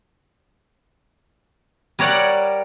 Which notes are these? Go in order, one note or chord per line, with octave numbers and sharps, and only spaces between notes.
G3 A#4 C#5 D5 F#5